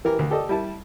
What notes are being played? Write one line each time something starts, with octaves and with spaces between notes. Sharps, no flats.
E3 G4 A#4
D2
G4 A4 D5 D#5
G3 E4 A5